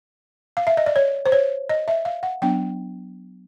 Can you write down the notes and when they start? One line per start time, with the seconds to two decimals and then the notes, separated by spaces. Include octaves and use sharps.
0.57 F5
0.67 E5
0.77 D#5
0.86 D5
0.96 C#5
1.26 C5
1.32 C#5
1.69 D#5
1.88 E5
2.05 F5
2.23 F#5
2.42 F#3 B3 D4 G5